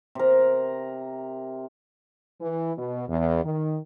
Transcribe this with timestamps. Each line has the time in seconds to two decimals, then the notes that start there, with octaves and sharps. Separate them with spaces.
0.15 C3 A#4
2.41 E3
2.78 B2
3.09 E2
3.44 D#3